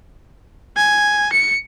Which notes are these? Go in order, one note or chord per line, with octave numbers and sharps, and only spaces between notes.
G#5
C#7